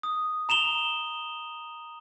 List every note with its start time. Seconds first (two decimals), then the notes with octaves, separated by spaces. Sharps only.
0.03 D#6
0.49 A#5 E7 F7 G7